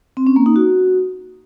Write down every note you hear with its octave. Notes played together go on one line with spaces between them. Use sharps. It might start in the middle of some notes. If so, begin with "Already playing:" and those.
C4
C#4
A#3
D#4
F#4